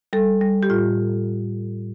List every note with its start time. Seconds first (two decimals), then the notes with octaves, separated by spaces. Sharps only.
0.13 G3 A4
0.41 G3
0.63 G4
0.70 A2 F4